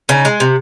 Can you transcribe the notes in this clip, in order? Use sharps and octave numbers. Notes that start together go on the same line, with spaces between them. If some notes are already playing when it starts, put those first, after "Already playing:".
C#3 D#4
G#3
C3